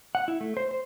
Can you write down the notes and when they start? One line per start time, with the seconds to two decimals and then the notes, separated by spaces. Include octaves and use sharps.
0.15 F#5
0.28 E4
0.41 A3
0.57 C5
0.71 C5